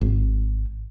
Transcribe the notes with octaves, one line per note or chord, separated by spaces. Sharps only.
G#1